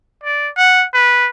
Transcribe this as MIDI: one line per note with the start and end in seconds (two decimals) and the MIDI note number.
0.24 0.49 74
0.57 0.86 78
0.94 1.29 71